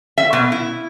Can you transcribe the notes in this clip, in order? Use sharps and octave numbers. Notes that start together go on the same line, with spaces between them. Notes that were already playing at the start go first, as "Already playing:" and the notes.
E5
B2
E4